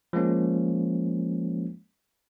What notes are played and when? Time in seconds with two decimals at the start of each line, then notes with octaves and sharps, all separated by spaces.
0.13 F3 G#3 A#3 C#4